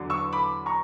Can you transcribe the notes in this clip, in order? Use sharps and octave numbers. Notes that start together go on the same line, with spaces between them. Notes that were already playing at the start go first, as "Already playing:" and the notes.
Already playing: E2 D3 F#3
C#6 E6
B5 D6
A#5 C#6